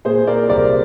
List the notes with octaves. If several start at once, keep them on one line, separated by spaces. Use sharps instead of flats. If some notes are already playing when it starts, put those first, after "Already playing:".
A#2 G#4 C5
A#4 D5
C2 A#4 D5